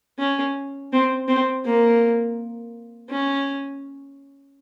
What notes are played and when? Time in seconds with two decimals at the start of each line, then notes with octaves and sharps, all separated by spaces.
0.19 C#4
0.93 C4
1.28 C4
1.65 A#3
3.10 C#4